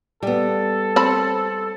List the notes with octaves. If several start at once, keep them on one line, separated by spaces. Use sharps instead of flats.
G3 B3 A4
C4 A5 B5